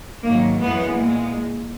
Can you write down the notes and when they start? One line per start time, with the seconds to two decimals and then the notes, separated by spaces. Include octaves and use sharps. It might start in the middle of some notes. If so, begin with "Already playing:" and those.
0.24 G#2 D#3 F#3 A#3
0.61 F#2 E3 G#3 B3
0.97 A#2 G#3